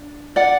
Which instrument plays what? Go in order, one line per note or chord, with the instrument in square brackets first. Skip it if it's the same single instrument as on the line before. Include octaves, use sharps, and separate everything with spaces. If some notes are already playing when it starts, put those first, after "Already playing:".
Already playing: [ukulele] D4
D5 F#5